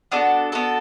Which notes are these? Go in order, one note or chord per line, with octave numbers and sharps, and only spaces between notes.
B3 D4 F#4 A4
B3 D4 F#4 A4